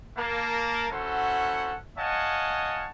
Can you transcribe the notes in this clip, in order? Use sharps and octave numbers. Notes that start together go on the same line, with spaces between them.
A#3 A#4 A5
C#4 E4 F#4 A4 C5 F#5
C#5 D#5 F5 F#5 G#5 A5